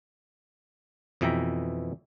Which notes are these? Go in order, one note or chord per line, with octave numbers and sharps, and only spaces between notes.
F2 B2 E3 E5 G5 A#5